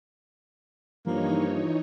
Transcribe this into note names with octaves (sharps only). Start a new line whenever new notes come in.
G2 E3 F3 A#3 D#4 C#5